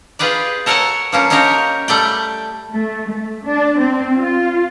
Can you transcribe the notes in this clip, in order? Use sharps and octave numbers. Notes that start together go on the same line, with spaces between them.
F4 G4 G#4 B4 D5
A4 A#4 C#5 F#5 G#5 A5
F3 A#3 C#4
C#4 D#4 F#4 G4 A#4 C#5
G3 A3 D5 G5
A3
A3
D4
C4
F4